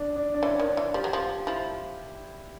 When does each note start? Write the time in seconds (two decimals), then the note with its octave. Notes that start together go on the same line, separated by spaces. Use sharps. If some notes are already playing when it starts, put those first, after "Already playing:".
Already playing: D4
0.16 D4
0.34 D4
0.42 E3 C#4
0.60 D#3
0.68 D4
0.77 E3
0.94 F3 G4
1.04 F#3
1.13 F3
1.47 F3 E4